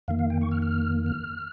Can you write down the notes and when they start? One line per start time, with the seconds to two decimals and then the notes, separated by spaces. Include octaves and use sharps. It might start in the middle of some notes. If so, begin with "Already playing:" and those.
0.08 F2 D#3 A#3 F5
0.19 F5
0.30 G5
0.41 C#6
0.51 F6
0.62 F6
1.06 F6